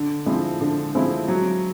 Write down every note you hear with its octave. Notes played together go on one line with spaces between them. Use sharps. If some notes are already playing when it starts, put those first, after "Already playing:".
Already playing: D3
F3 G#3 C4 E4
D3
F3 G#3 C4 E4
F#3